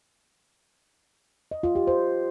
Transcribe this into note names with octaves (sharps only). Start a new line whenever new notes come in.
D#5
F4
G4
C5